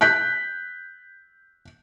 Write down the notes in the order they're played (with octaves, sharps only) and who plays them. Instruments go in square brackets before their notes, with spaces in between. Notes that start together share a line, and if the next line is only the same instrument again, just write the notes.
[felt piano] F#6 G6 B6